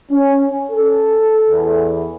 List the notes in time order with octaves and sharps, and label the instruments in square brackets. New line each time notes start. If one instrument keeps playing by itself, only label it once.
[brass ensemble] C#4
A4
E2